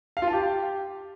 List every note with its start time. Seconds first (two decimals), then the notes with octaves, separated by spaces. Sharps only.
0.17 F5
0.22 F4
0.28 A5
0.33 G4